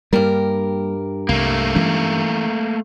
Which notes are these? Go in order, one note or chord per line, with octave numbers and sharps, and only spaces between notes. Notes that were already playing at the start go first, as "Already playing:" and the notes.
G2 G3 A#3 G4 A#4
C2 A3 A#3
E3 G#3 C#4